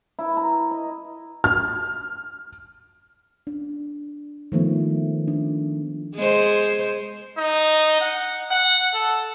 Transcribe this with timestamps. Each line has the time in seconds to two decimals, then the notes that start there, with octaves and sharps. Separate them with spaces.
0.19 E4
0.37 A#5
0.71 D#5
1.44 F6
3.47 D4
4.52 D#3 F3 A3 B3
5.27 D4
6.15 G#3 C5
7.38 D#4
8.01 F#5
8.51 F#5
8.94 A4